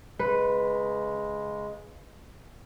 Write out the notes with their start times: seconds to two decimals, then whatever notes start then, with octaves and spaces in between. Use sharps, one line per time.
0.19 C#3 G#3 B4